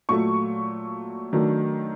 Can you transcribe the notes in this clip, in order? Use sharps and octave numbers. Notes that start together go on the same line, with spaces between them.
A#2 F#3 A3 C#6
D#3 F#3 A3 D4